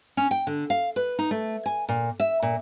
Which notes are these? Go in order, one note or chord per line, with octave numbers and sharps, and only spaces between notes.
C#4
G5
D3
F5
B4
D#4
A3
G#5
A#2
E5
A#2